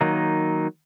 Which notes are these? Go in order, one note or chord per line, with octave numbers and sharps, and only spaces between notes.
D#3 F#3 A#3 D#4